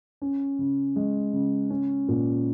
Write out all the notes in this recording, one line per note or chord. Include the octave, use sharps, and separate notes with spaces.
C#4
C#3
G#3
C#3
C#4
A#2